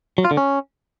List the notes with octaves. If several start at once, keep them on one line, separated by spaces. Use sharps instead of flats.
F#3
F4
D3
C#4